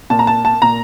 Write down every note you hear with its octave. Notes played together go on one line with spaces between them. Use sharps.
A#2 A5
A#5
A5
A5
A#2 A#5